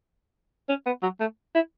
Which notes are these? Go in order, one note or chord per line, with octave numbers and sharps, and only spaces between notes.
C#4
B3
F#3
A3
E4